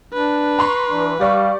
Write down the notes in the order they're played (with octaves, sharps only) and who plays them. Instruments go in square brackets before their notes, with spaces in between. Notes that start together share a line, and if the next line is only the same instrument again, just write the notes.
[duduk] D4 [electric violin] B4
[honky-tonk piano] A#5 C6 C#6
[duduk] E3 [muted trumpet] D4
[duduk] G3 [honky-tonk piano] G4 D5 C#6 [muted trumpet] F5